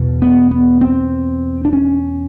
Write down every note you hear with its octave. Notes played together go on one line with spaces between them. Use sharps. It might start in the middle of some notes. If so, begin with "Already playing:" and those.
Already playing: E2 B2
B3
B3
C4
D4
C#4